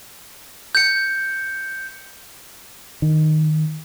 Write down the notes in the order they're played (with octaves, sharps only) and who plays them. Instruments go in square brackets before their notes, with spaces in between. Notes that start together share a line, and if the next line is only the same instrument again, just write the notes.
[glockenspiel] G6 C#7
[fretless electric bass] D#3